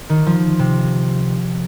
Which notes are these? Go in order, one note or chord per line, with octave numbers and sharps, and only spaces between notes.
D#3
F3
C3